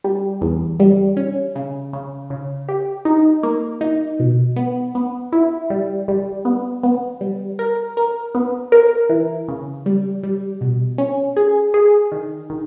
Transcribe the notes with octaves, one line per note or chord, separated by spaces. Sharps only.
G3
E2
G3
C#4
C#3
C#3
C#3
G4
D#4
A#3
D#4
B2
B3
B3
E4
G3
G3
B3
B3
G3
A#4
A#4
B3
A#4
E3
C#3
G3
G3
B2
C#4
G#4
G#4
D#3
D#3